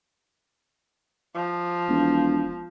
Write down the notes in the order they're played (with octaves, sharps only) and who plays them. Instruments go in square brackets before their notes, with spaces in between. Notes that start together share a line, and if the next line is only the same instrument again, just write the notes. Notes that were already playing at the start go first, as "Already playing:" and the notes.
[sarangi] F3
[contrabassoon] E1